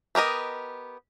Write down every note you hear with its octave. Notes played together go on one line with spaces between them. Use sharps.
B3 G4 A#4 D#5